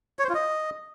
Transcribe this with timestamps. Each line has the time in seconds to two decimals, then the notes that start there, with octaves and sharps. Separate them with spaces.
0.19 C#5
0.24 C5
0.29 F4
0.35 D#5